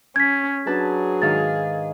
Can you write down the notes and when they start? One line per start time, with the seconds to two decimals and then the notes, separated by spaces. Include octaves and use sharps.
0.16 C#4 G#6 B6
0.67 F#3 D4 G#4 B4 A5
1.22 G#2 D#3 F5 A6